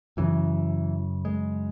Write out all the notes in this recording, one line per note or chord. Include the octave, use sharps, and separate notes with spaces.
F#2 C#3 E3
G#3